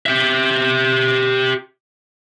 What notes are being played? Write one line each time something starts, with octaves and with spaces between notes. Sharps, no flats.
G4 E5